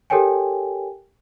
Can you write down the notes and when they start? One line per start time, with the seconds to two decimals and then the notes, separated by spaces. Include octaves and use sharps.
0.10 G4 A4 A#4 C#5 G5 G#5